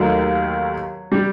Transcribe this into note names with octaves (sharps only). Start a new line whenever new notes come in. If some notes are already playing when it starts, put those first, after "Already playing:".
Already playing: D#2 D#3 F#3 A3
G3